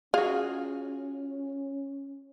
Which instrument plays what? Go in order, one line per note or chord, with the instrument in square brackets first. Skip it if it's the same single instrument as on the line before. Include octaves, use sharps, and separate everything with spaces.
[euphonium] C#4 [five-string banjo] F4 F#4 [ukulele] G#4 [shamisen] F5